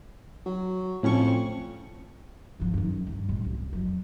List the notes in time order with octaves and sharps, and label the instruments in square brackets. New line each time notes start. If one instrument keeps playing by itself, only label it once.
[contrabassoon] F#3
[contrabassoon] F2 [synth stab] A2 C#4 C#6
[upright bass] G#1 F3
F#2 D#4
G2
F#2 A2
C2
F2 F#3